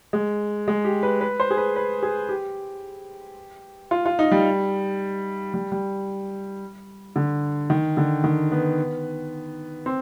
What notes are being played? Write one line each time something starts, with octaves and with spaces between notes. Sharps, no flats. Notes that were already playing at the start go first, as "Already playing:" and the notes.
G#3
G#3
G4
B4
B4
C5
G#4
B4
B4
G#4
G4
F4
F4
D#4
G3
G3
G3
D3
D#3
D3
D#3
B3
C4